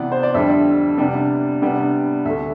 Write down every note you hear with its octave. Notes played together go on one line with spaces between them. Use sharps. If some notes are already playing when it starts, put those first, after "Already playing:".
Already playing: C3 E3 B3 D5
C5
D5
F2 D3 G3 D4 E5
C3 G3 B3 D4
C3 G3 B3 D4
D2 D3 A3 E5